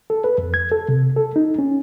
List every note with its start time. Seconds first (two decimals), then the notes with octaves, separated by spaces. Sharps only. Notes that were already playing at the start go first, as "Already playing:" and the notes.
0.10 A4
0.24 B4
0.38 F2
0.54 G#6
0.72 A4
0.89 C3
1.16 A4
1.36 D#4
1.59 C#4